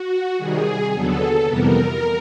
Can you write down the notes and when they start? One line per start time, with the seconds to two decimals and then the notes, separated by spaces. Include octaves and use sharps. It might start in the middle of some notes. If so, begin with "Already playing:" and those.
Already playing: F#4
0.37 C3 D#3 G3 G#4
0.92 D#2 D3 F#3 B3 A4
1.47 F2 C3 E3 G3 B3 A#4